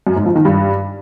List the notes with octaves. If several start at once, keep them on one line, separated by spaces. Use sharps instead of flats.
F#2
G#2
F3
D#3
G2